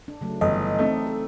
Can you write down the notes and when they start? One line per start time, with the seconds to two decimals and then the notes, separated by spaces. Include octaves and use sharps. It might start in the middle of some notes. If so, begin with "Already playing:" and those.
0.08 D4
0.21 C#3 F#3 A3
0.41 G1 E3 C#5 D#5
0.79 A3 C4 D4 D#4
1.07 A4